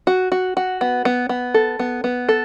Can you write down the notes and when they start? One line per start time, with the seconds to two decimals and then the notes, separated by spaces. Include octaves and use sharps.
0.07 F#4
0.32 F#4
0.57 F#4
0.81 B3
1.05 B3
1.29 B3
1.54 A4
1.79 B3
2.04 B3
2.29 A4